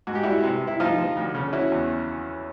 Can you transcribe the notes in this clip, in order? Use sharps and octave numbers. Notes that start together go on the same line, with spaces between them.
G#2 F#4
G4
G3 E4 F#4
C3
C3
E4
F3 D#4 F4
F3
D2
C#3
C#4 E4 F#4
E2